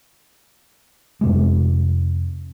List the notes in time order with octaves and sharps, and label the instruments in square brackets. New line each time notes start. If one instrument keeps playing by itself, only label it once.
[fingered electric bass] F2 C3 G#3